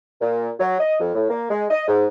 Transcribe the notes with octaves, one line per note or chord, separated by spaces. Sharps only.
A#2
F#3
D#5
F2
A2
A#3
G#3
D#5
G#2